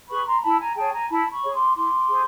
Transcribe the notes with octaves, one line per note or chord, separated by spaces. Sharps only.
G#4 B4 B5 C#6
A#5 C6
E4 A5 B5
G#5 A#5
G#4 C#5 G5 A5
G#5 A#5
E4 A5 B5
B5 C#6
G#4 C#5
C6 D6
E4 C6 D6
G#4 C5